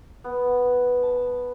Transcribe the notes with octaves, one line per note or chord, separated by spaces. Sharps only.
B3
A5